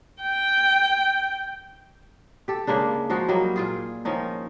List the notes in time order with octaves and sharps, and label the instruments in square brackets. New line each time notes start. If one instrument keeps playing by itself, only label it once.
[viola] G5
[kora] G4 A4
C#3 G#3 A#3 D4
F3 G#3 D#4 F#4
F#3 G3 A#3 D#4
A#2 F4 G#4
D#3 F3 C#4 D#4